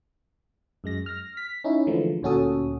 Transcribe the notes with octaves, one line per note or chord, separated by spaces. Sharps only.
F#2 G#3 A#6
F6 A#6
B6
C#4 D#4 E4
D3 E3 F3 G#3 A3
D2 A#2 C#4 F#4 A4 D#6